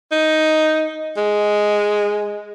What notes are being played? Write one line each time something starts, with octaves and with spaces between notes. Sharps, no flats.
D#4
G#3